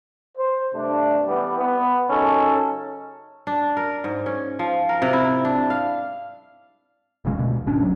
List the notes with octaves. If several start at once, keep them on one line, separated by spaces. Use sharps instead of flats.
C5
G2 C3 A3 D4
E3 G3 B3
B3
F#2 C#3 C#4 D#4 A4
D4
A#4
G#2
C#4
F3
A#4
C3
E4
D4
F5
E1 F2 C#3 G#3
D2 B2
G#1 C#4 D4
D2 F#3